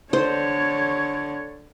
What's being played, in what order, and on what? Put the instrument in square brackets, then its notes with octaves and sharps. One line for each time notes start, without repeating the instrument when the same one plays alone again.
[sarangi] D3 [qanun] C5 [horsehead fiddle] C#5